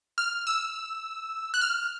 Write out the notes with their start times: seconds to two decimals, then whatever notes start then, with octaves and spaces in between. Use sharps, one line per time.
0.18 F6
0.47 E6
1.54 F#6
1.61 F6